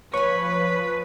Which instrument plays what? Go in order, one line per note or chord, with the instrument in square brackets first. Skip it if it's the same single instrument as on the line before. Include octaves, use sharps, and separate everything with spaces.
[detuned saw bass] F3 [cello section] B4 [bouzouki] C#5 G#5 [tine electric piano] C#6